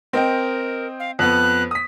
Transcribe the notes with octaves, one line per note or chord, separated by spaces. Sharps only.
C4 A#4 D#5 G5
F5
F2 B3 F#6
D#6 B6